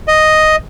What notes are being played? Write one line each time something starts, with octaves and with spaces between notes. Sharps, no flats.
D#5